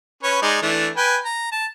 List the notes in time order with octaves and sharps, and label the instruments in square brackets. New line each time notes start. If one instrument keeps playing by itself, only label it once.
[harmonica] C#4 B4 C#5
G#3 D#4 D5
E3 A3 D4
B4 G5 G#5
A#5
A5